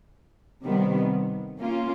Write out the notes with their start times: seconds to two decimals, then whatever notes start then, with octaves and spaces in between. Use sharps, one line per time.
0.64 C3 D#3 G3 B3
1.58 A#3 C#4 F4